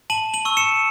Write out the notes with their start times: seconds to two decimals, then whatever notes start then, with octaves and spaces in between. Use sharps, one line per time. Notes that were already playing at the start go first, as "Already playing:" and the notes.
0.10 A5 D#7 F#7
0.34 D#7 F#7
0.45 C#6 E6
0.57 C#7 E7